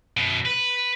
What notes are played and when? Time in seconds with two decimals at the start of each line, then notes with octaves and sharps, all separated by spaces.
0.17 F#2 B2
0.45 B4